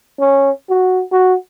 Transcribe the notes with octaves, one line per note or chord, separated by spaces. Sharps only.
C#4
F#4
F#4